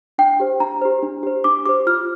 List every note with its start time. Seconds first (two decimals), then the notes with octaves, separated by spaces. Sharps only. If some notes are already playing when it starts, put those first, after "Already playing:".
0.18 D4 G5
0.40 G4 C5
0.60 D4 A#5
0.81 G4 C5
1.03 D4
1.23 G4 C5
1.44 D4 D6
1.66 G4 C5 D6
1.87 F4 F6